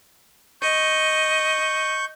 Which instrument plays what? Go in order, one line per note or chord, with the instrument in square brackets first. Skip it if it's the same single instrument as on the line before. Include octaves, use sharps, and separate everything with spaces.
[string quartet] D#5 [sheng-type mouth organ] C#6 G6